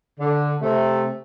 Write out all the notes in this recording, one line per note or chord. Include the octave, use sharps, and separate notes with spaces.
D3
C3 A3